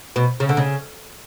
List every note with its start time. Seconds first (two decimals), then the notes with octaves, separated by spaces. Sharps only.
0.16 B2
0.40 C#3
0.49 D3
0.57 C#3